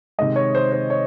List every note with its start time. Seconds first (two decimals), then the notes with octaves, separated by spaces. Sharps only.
0.19 C3 D#3 G#3 D#5
0.36 C#5
0.55 C5
0.72 C5
0.90 C#5